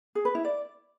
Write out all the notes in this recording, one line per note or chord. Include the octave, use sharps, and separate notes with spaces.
G#4
B4
E4
D5